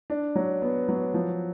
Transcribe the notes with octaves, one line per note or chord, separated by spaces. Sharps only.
D4
F#3
B3
F#3
F3